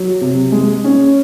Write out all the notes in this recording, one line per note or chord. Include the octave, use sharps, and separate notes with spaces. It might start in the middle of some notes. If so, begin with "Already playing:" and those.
Already playing: F#3
C3
G#3
C#4